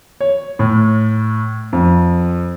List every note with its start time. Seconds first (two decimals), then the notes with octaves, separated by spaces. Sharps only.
0.21 C#5
0.59 A2
1.73 F2